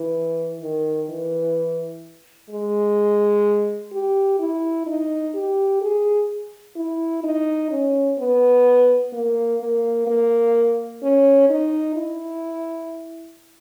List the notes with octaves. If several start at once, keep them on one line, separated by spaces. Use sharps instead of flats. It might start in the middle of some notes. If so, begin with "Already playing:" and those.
Already playing: E3
D#3
E3
G#3
G4
E4
D#4
G4
G#4
E4
D#4
C#4
B3
A#3
A#3
A#3
C#4
D#4
E4